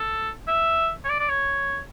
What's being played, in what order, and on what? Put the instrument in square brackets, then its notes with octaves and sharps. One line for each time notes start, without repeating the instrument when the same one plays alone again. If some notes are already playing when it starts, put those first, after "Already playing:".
Already playing: [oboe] A4
E5
C#5
D5
D5
C#5